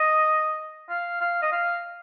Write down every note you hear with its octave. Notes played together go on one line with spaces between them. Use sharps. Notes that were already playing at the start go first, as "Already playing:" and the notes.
Already playing: D#5
F5
F5
D#5
F5